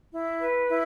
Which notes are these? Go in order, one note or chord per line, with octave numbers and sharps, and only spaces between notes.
E4
B4
E4